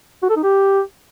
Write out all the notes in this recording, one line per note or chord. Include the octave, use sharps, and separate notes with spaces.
F#4
A4
D#4
G4